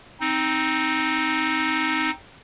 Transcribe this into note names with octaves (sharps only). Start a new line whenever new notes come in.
C4 D#4